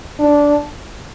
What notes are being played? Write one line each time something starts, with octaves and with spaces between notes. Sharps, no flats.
D4